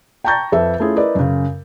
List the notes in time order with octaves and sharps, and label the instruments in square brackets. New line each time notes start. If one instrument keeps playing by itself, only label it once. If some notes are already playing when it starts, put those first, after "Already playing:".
[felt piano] G5 A5 A#5 C#6 G6 A6
F2 A4 B4 E5
A3 C#4 E4 F4 G#4
E4 A#4 B4 D5 D#5
F#2 C#3